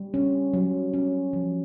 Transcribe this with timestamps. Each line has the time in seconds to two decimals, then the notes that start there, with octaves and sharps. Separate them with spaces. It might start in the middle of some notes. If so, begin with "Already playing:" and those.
Already playing: G3
0.14 C#4
0.53 F#3
0.94 C#4
1.33 F3